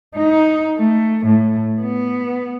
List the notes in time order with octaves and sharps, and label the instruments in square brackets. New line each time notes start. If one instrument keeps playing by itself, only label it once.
[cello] D#4
A3
A2
B3